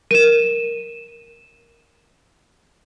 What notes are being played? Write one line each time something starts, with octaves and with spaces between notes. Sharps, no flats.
A#4 D#7 E7